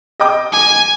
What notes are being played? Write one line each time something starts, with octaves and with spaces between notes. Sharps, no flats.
D#5 G5 D6
G#5